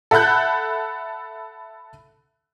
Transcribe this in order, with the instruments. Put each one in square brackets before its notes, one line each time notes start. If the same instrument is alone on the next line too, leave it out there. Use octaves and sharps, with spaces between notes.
[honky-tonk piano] A4 E5 F#5 B5 F#6 G6